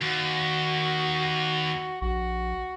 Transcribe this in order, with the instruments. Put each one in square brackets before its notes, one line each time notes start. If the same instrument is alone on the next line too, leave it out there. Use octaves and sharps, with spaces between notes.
[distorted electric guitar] D#2 [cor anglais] F#4
[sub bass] A#1 [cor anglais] F#4